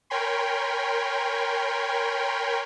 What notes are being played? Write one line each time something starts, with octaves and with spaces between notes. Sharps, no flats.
A#4 C#5 G5 G#5 B5 C6